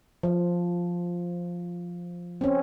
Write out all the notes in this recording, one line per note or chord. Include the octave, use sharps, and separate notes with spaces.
F3
C4 C#4